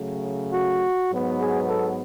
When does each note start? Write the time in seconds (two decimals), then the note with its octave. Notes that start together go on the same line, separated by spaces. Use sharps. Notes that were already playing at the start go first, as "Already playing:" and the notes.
Already playing: C#3 F#3 A3
0.51 F#4
1.10 G#2 F#3 B3
1.39 G#4
1.68 A4